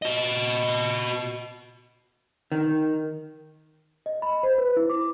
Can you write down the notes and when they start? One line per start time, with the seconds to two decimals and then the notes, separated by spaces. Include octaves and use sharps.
0.02 F#4 D#5
2.52 D#3
4.06 D#5
4.22 B5
4.43 C5
4.58 B4
4.77 E4
4.90 D6